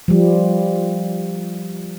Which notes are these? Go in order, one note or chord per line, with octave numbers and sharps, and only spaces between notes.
F3 G3